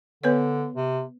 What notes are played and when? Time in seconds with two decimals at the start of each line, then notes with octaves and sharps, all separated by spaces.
0.24 D3 B3 B4 C#5
0.76 C3